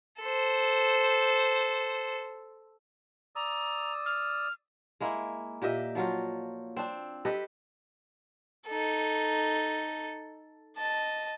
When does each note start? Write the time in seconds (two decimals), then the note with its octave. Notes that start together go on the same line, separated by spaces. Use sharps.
0.20 A4 C5
3.36 D5 A#5 D#6 E6
4.06 F6
5.00 G#3 A#3 E4
5.62 A#2 G4 D#5 E5
5.95 F3 F#3 F4
6.77 C4 D4
7.25 G4 A4 B4 D#5
8.67 D#4 A4
10.77 D#5 A5